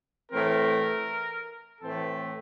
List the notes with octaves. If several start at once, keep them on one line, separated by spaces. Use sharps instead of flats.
A2 E3 A3 C4 A#4
A2 E3 A3 C4 A4